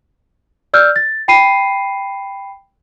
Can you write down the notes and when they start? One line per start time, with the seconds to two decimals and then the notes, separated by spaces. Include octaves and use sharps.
0.74 D5 E6 F6 G6
0.96 A6
1.28 G5 B5 C7 D#7